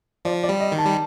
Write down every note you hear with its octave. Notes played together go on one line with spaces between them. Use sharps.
F3 D5
D5
G3
D#5
D#3
A5
G3